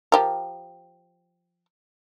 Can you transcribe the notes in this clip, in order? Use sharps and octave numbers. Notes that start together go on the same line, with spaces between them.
F3 G4 A#4